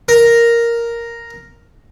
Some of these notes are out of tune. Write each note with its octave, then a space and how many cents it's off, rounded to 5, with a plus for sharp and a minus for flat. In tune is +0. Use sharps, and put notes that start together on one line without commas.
A#4 +0